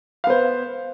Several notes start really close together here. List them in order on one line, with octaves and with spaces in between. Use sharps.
F5 B3 C5